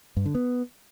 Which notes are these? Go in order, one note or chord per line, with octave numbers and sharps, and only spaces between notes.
G2
D3
B3